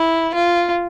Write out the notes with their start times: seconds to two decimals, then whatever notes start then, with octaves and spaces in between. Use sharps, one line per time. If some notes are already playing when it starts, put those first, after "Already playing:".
Already playing: E4
0.34 F4